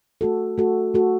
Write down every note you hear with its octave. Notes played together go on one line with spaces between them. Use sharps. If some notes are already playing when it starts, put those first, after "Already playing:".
A3 F#4 A4
A3 F#4 A4
A3 F#4 A4